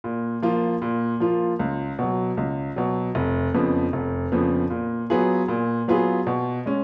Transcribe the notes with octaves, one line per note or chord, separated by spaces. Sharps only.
A#2
F3 A#3 F4
A#2
F3 A#3 F4
C#2
B2 F#3
C#2
B2 F#3
F1
F2 C#3 F3 B3
F1
F2 C#3 F3 B3
A#2
F#3 B3 F4 G#4
A#2
F#3 B3 F4 G#4
B2
G#3 C#4